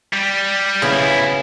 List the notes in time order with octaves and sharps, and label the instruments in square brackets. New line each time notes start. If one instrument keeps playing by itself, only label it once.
[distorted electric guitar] G3
[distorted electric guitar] B1 E4 [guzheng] C#3 B3